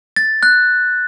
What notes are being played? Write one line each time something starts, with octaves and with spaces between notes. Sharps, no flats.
A6
F#6